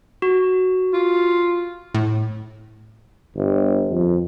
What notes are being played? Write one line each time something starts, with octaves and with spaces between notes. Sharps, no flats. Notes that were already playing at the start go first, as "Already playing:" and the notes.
F#4
F4
A2
G1
F2